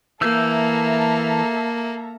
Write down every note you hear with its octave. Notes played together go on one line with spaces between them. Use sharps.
E3 A#3 A4 E5 A#5 E6 G6